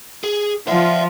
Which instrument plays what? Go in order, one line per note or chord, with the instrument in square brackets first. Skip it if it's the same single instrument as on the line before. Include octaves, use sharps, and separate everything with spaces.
[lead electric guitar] G#4
[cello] F3 F4 [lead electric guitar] E5 F#5